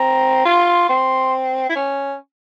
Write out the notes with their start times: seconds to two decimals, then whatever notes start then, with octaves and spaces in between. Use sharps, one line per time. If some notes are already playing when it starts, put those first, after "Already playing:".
Already playing: C4 A#5
0.45 F4 C6
0.89 C4 C6
1.70 E4
1.76 C#4